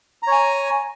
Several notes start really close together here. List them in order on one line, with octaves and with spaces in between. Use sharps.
A#5 C#5 G#5